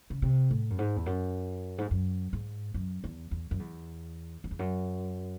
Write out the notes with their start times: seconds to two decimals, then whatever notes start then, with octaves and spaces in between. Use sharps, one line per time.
0.10 C#3
0.22 C3
0.51 A2
0.70 F#2
0.79 G#2
0.96 E2
1.06 F#2
1.78 G#2
1.91 F#2
2.33 G#2
2.74 F#2
3.04 E2
3.31 E2
3.51 F#2
3.59 E2
4.44 F#2
4.51 E2
4.59 F#2